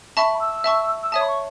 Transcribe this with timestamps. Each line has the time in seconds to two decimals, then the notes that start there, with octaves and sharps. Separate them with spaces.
0.17 E5 A5 B5 C#6
0.40 E6
0.64 E5 A5 C#6
1.03 E6
1.12 C#5 E5 A5 D#6
1.21 B5
1.28 C#6